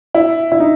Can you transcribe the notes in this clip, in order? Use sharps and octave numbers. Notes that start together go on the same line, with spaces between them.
E4
E4
D#4